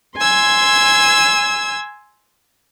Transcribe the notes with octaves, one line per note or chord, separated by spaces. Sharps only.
G#5 C6 E6 G#6